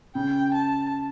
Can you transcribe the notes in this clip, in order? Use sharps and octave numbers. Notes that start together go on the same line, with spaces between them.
C#3 G5
A5